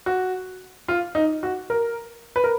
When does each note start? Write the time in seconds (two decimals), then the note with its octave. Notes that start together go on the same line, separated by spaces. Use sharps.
0.06 F#4
0.88 F4
1.15 D#4
1.43 F#4
1.70 A#4
2.36 B4
2.44 A#4